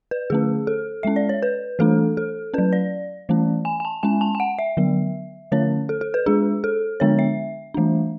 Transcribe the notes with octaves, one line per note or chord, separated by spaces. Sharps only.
B4
D3 A3 C#4 G#4
A4
G#3 C#4 E5
D5
C#5
B4
E3 A3 D4 A4
A4
F#3 C#4 B4
D5
E3 A3 C#4
G#5
G#5
A5
G#3 C#4 G#5
A5
G#5
F#5
E5
D3 F#3 B3
D3 A3 C#4 C#5
A4
A4
B4
G#3 D4 G#4
A4
D3 G#3 B3 D4 C#5
E5
E3 A3 D4